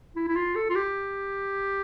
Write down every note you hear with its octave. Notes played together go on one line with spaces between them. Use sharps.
E4
E4
F4
A4
F4
G4